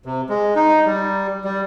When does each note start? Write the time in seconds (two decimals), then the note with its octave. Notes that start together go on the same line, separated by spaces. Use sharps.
0.05 C3
0.29 G#3
0.56 D#4
0.85 G3
1.44 G3